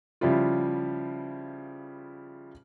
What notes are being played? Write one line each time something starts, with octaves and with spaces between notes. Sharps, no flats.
C#3 F3 G3 E4 F4